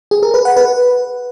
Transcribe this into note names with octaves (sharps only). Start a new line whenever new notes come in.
G#4
A#4
B4
F#5
B4